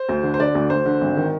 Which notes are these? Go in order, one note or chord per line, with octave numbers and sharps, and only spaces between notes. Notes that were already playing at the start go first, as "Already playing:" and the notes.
Already playing: C5
D2
D3
C5
D3 D5
D2
D2 C5
D3
G#1
D#3